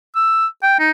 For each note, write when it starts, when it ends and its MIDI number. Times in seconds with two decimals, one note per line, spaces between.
0.16 0.47 88
0.63 0.79 79
0.79 0.91 63